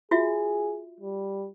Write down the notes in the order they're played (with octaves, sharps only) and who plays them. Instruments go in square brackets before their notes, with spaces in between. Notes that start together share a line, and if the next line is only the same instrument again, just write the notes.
[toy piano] F4 F#4 E5 [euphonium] G#4
[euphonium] G3